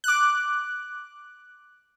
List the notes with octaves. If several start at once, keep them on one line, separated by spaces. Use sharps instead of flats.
D6 F#6